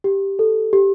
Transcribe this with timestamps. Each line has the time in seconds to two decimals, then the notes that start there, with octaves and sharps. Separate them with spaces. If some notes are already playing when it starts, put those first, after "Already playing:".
0.04 G4
0.39 A4
0.73 G4